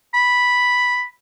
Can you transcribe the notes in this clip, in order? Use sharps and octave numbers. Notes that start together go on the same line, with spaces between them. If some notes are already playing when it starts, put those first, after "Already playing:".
B5